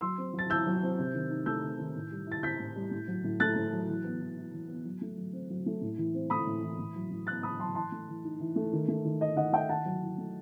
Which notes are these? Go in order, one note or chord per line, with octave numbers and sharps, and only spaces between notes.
F#3 C6 E6
C4
F#3
A6
E4 E6 G6
F#3
C4
C3
D#3
D#4
A3 E6 G6
C3
D#3
A2
G3
E4 A6
C4 G6 B6
A2
G3
A2
F#3
A2
A3 F#6 A6
A2
F#3
E3
B3
E3
E4
E3
B3
F#3
A3
F#3
C4
F#3
A3
A2
E3
C4
A3 B5 D#6
A2
E3
A2
F#3
A2
B3 F#6 A6
A2 B5 D#6
F#3 A5 C6
E3 A5 C6
A3
E3
D#4
E3
A3
D#3
A3
D#3
D#4 D#5
D#3 D#5 F#5
A3 E5 G5
D#3 F#5 A5
F#3
E4
A3